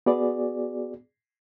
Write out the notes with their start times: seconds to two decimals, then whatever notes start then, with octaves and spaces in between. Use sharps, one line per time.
0.06 B3 F#4 G#4 D5